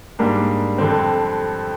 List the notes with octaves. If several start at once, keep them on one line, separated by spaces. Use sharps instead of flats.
G#2 G3 A#3 D4
F2 D3 G3 C4